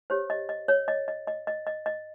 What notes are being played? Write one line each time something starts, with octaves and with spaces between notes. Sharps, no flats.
G4 C5 C#5
D#5
D#5
C#5
D#5
D#5
D#5
D#5
D#5
D#5